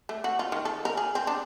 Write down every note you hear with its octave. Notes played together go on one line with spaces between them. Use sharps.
A3
F#4
F4
D#3
A4
A#4
G#4
C4
D4